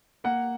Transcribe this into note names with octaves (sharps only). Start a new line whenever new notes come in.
A#3 F#5